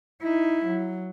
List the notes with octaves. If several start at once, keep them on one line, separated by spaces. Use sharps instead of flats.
D#4 E4
F#3